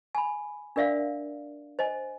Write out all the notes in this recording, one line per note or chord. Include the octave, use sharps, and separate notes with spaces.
G#5 B5
D4 A#4 D5 E5 F5
C5 D#5 G#5